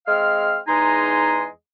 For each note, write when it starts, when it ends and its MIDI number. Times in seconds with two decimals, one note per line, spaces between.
0.07 0.57 56
0.07 0.57 60
0.07 0.57 77
0.07 0.57 89
0.67 1.45 40
0.67 1.45 56
0.67 1.45 63
0.67 1.45 80
0.67 1.45 82
0.67 1.45 84